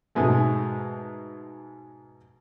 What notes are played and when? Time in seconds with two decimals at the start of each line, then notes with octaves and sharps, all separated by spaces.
0.15 G#2 B2 G#3 A3